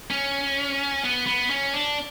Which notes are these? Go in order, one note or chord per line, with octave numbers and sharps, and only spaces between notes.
C#4
B3
B3
C#4
D4